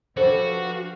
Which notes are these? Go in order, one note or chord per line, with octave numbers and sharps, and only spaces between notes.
F3 D4 F#4 G4 A4 B4 C5 F5